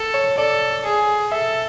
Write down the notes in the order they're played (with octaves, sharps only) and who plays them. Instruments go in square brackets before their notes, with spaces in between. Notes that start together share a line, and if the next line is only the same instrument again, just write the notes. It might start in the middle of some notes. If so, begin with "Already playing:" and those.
Already playing: [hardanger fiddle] A4
[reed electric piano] C#5
[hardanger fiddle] A4 [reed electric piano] D5
[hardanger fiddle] G#4
[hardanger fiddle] A4 [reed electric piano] E5